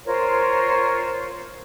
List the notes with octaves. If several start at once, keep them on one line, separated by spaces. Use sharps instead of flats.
F4 A#4 C5 C#5